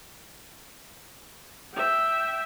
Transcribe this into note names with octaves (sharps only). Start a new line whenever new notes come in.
E5 G5